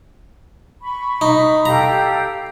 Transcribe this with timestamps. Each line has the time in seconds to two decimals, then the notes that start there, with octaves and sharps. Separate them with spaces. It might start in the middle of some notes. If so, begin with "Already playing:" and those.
0.82 B5 C#6
1.21 D#4
1.66 G4 A4 F5 A#5